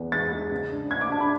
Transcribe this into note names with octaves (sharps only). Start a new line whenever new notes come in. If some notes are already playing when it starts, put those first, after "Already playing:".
Already playing: E2 B3
G#3 A6
G#3
C#3
D4
D4 G#6
D6
D4 A5
B5